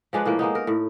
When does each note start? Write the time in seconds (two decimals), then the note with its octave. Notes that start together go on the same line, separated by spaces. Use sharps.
0.13 F3 G#3 D4 B4
0.25 A2 F3 A#3
0.39 G#3 A#3 B3 D#4
0.55 A#4
0.67 A2